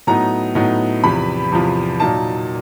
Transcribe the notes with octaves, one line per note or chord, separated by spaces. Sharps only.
A2 F#3 B3 D#4 A#5
A2 F#3 B3 D#4
E2 C3 F3 B5
E2 C3 F3
A#2 F#3 A#3 D#4 A5